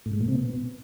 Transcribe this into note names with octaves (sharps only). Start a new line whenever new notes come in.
A2
G#2
A#2
C3
B2